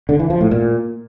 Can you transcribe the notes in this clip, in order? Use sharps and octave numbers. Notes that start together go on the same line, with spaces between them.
D3
E3
F3
A2
A#2